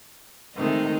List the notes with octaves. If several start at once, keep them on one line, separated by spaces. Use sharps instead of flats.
D#3 G#3 A3 C4 D#4